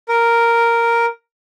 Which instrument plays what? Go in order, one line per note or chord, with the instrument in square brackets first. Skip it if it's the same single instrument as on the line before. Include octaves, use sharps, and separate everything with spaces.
[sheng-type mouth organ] A#4